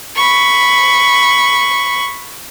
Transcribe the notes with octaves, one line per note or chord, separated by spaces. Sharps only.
B5 C#6